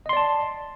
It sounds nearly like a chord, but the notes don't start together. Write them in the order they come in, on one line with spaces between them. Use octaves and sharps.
D#5 C6 D5 A5